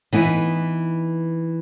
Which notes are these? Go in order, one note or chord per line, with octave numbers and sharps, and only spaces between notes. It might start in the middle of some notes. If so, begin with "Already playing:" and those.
E3 B3 D#4 E4